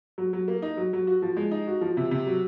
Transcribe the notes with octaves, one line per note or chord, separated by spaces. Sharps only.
F#3
F#3
A#3
D#4
F#3
F#3
F#4
F3
G#3
D#4
F#4
F3
C3
C3
F#3